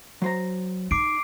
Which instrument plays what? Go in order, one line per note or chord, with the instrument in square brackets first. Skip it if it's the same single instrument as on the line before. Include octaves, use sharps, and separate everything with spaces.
[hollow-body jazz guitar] F#3 C5 A#5
[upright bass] D#4 [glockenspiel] D6 C7 D7